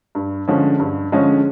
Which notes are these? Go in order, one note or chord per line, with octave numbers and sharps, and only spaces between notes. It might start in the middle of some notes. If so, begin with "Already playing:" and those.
G2
D3 F3 G#3 C#4
G2
D3 F3 G#3 C#4